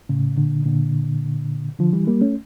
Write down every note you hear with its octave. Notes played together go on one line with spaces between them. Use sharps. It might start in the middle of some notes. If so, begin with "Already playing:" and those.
A2 C#3
A#2 D3
A#2 D3
D3 F3
E3 G3
G3 A#3
A3 C#4